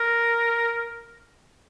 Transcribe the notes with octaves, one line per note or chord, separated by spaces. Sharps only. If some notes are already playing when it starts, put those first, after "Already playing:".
Already playing: A#4